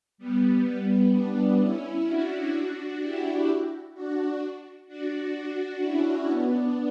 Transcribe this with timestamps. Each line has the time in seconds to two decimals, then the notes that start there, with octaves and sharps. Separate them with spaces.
0.18 G3 B3
0.65 G3 B3
1.12 B3 D4
1.59 C#4 E4
2.06 D4 F#4
2.53 D4 F#4
3.00 E4 G4
3.94 D4 F#4
4.87 D4 F#4
5.35 D4 F#4
5.81 C#4 E4
6.29 B3 D4